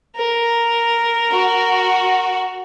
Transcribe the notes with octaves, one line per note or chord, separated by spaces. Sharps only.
A#4
F#4